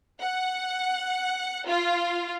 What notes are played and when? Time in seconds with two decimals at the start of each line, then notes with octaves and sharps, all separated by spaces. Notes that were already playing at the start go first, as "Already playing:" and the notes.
0.21 F#5
1.67 F4